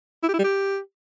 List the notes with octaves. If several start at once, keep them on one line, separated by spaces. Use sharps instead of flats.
E4
G4
E4
G3
G4